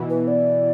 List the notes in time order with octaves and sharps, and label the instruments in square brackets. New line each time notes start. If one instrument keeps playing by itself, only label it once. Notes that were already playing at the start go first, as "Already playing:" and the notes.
Already playing: [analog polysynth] B2 E3
[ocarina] B4
D5